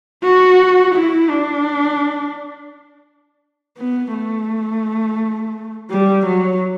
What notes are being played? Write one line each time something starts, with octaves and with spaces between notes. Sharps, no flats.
F#4
E4
D4
B3
A3
G3
F#3